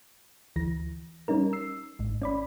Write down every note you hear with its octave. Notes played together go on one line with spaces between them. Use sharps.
D2 E3 A#6
G3 C#4 D#4 A#4
E6 C7
G#1 G#2
C#4 D5 B5